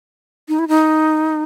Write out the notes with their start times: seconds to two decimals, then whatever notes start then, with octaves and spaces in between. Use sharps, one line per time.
0.48 D#4
0.59 E4
0.68 D#4